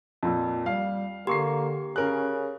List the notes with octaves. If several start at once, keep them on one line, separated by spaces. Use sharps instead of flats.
F2 A#2
G3 F5
D3 A#3 G4 C6 C#6 C7
C#3 C#4 A#4 F#6